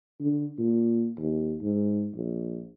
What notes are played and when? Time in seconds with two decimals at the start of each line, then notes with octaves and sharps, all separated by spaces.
0.20 D3
0.59 A#2
1.18 D#2
1.61 G#2
2.15 A#1